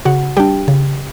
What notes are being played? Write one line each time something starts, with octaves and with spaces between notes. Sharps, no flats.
C#3 F#4 F#5
G3 D4 G4 G5
C#3